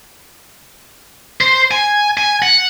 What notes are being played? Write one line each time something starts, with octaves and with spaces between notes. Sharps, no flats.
C5
G#5
G#5
F#5